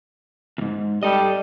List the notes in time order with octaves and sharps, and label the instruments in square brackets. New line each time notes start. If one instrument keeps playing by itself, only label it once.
[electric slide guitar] E2 G#2
[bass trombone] G3 [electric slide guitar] A4 D#5